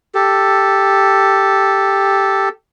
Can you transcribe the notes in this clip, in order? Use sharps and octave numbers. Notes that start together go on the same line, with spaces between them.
G4 A4